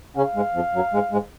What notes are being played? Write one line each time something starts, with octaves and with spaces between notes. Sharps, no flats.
C#3 C#4 F5
G#2 G#3
F2 F3
F#2 F#3
G#2 G#3
G#2 G#3